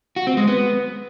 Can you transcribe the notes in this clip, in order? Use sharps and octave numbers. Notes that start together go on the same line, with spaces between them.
F#4
C4
G#3
B3